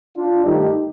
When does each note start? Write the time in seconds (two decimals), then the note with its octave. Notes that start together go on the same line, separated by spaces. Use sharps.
0.16 D4 F4
0.44 G2 D#3 A3 D#4 G4